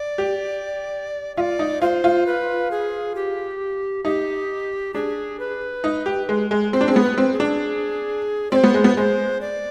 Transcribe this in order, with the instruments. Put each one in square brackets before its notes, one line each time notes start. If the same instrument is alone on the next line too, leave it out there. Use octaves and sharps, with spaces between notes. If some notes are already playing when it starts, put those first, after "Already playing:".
Already playing: [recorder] D5
[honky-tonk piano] G4
[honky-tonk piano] F4 [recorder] D5 E5
[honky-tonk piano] D#4
[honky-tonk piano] F4 [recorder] C5
[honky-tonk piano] F4
[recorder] B4
G#4
G4
[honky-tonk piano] D#4 [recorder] G4
[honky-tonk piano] D4 [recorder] G#4
[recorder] B4
[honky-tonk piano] D#4
G4
G#3
G#3
[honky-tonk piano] C4 [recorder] C5
[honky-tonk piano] D4
C4
[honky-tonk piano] B3 [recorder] G#4
[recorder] B4
[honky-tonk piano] C4
[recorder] G#4
[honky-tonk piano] D4
[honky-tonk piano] C4 [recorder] C5 D5
[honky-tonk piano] B3
G#3
B3
[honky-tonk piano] G#3 [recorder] C5
[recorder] D5